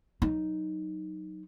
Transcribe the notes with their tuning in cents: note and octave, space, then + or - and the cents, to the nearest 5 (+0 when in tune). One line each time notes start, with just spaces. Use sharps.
F#3 +0 D#4 +0